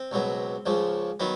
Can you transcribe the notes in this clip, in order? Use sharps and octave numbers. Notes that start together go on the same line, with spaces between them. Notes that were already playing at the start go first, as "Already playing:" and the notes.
Already playing: C4
C#2 B2 F#3
C#2 C#3 F3
D#3 F#3 B3